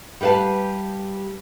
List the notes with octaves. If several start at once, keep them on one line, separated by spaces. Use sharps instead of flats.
G3 G4 B4 F5 A5